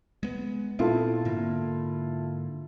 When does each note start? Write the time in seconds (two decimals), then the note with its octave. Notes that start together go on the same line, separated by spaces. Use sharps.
0.23 G#3 B3
0.79 A#2 B3 C4 E4 F4 A4
1.25 G#2 D3 A#3